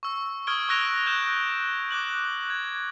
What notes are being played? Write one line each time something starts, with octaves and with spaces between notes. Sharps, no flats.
C#6 E6
C#6 D#6 F6 G#6 D7 G7
C#6 E6 F#6 A#6 D7 F7
E6 F#6 G6 E7
D6 F#6 F#7
G#6